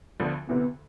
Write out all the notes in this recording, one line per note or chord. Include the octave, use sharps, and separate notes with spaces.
D2 D3 F3 B3 D4
D2 C3 E3 B3